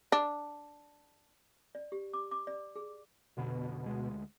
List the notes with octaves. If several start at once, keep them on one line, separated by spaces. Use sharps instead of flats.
D4
D5
G4
D6
D6
D5
G#4
F1 B2 D3 B3
D2 G#3